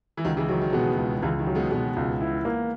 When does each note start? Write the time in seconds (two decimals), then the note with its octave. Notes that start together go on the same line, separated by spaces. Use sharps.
0.17 E3
0.24 C#2 D#3 F#3
0.37 C#3 E3
0.48 D#3 F#3
0.61 D#3
0.73 B2 G#3 B3
0.97 C#2
1.22 C#2 C#3 E3
1.39 D#3
1.47 F#3
1.55 G#3 B3
1.71 B2 G#3 B3
1.96 C#2
2.21 E4
2.45 A#3